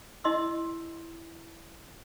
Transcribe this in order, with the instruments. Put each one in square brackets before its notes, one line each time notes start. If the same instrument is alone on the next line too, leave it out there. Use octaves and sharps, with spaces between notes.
[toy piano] E4 D#5 C6 E6